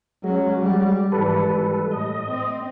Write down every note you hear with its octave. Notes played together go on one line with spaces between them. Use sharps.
F#3 G#3 C#4 F#4
G3
G#1 E3 G3 A4 B4
A2 D#5
C4